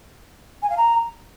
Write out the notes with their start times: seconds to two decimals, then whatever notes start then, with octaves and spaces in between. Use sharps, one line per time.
0.62 G#5
0.70 F5
0.77 A#5